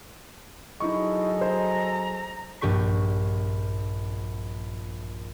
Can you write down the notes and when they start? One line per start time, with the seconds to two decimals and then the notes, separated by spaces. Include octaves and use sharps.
0.80 F#3 D#4 E4 G#4 A4 D#5 C#6
1.41 C5 A#5
2.61 A#1 G2 G4 C#6 B6